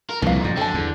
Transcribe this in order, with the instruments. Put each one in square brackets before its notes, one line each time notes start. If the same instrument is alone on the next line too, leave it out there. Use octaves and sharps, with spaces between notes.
[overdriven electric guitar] A#4
[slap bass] C2 [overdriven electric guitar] F2 A#2 [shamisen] B4 F5
[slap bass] F#2
[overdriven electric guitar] D3 [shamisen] C4 A5
[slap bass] E2